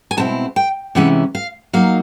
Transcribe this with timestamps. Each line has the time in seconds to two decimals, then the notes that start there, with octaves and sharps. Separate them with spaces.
0.11 G#5
0.17 B2 G#3 C4 E4 A5
0.56 G5
0.95 C3 E3 G#3 C#4 E4 F#5
1.35 F5
1.73 F#3 A#3 D#4 F5